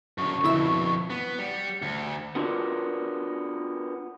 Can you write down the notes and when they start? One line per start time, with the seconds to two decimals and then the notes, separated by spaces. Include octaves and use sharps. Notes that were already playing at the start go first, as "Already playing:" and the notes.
0.18 F#2 D3 C#6
0.44 F2 B2 D3 E4 E6
1.10 B3
1.39 G3 C#7
1.82 D2
2.35 B3 D4 F4 F#4 A#4 D5